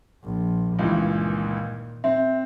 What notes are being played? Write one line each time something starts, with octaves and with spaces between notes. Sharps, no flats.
A#1
C#2 G2 A#2 D#3 E3
C4 E5